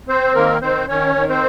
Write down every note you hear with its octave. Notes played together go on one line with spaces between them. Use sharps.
C4 C5
D#3 A#3 A#4
D#3 C4 C5
D#3 C#4 C#5
D#3
C4 C5